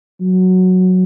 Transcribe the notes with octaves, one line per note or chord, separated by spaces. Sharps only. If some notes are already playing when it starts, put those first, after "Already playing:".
F#3